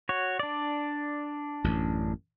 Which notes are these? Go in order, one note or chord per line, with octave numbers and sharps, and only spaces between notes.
F#4 C#5
D4 D5
A1 F#2